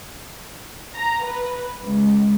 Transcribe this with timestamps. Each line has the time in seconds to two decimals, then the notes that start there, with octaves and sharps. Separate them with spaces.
0.95 A#5
1.24 B4
1.82 C#2